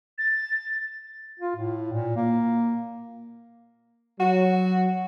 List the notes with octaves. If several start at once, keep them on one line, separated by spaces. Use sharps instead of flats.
A6
F4
A2
A#2
A#3
F#3 F#4